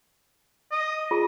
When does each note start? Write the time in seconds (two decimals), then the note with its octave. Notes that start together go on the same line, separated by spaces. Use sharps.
0.72 D#5
1.11 F4 G#4